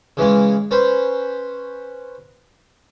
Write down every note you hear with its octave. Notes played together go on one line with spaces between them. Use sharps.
C#3 E3 G#3 C#4
C#4 B4 C5 B5